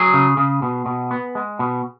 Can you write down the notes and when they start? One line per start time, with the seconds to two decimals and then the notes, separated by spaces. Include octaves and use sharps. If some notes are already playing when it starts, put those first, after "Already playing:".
Already playing: F#3 G#4
0.14 C#3
0.37 C#3
0.62 B2
0.86 B2
1.11 B3
1.35 G#3
1.59 B2